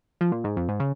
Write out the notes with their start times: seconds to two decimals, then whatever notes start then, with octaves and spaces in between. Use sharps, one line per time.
0.21 F3
0.32 A#2
0.44 G#2
0.57 F2
0.69 G#2
0.80 C#3